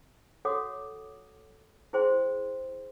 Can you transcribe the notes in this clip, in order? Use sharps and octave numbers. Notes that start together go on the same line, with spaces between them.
F#4 A4 C#5 F#5 D6 D#6
E4 G#4 C5 G5 C6